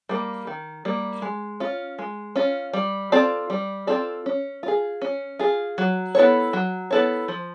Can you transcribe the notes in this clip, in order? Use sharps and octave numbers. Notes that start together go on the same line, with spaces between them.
G3 A#3
D#3
G3 A#3
G#3
C#4 F4
G#3
C#4 F4
G3
C4 F4 A4 D5
G3
C4 F4 A4 D5
C#4
F4 G#4
C#4
F4 G#4
F#3
B3 E4 A4 C#5
F#3
B3 E4 A4 C#5
F3